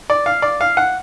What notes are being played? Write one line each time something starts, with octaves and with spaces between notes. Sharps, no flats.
D5
F5
D5
F5
F#5